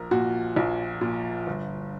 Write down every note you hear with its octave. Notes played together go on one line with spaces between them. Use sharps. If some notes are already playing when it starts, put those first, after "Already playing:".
Already playing: A#1 A#4
A#2 F#4
A#1
A#2
G1